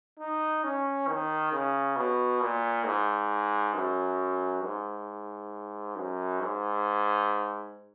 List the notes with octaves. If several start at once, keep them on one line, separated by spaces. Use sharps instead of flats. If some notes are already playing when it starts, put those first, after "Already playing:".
D#4
C#4
D#3
C#3
B2
A#2
G#2
F#2
G#2
F#2
G#2